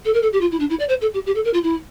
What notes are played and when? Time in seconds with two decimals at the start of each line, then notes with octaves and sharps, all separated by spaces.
0.05 A4
0.14 A#4
0.22 A4
0.33 G4
0.41 F4
0.51 E4
0.60 D4
0.70 E4
0.79 D5
0.89 C5
1.01 A4
1.14 G4
1.26 G4
1.35 A4
1.45 A#4
1.53 F4
1.63 E4